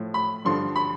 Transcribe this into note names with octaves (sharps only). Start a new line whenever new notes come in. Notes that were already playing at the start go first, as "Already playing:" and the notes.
Already playing: A2 F3
B5
G2 D3 F3 C6
B5